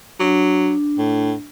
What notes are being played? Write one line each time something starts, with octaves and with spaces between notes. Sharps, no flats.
F#3 D4
A2